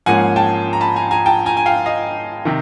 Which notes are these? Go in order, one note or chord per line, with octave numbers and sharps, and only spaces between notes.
G#2 F3 A#3 C#4 F#5 G#5
G5 A5
A#5
A5 B5
G#5 A#5
G#5 A#5
G5 A5
G#5 A#5
G#5
F5 G5
D#5 F5
C3 D#3